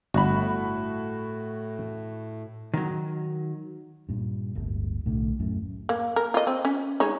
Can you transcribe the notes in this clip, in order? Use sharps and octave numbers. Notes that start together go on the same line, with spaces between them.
G1 A2 F#4 B5
D#3 F#3
G2 A#2
D1 G1
B1 A2 D3
D#1 F#2 A2
A#3
A#4
F4 D#5
C4
C#4
G#3 D#4 C#5